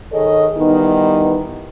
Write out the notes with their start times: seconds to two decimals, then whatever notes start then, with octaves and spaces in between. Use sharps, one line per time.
0.12 D#3 G#4 A4 C#5 D#5
0.56 D#3 E3 G3 B3 D#4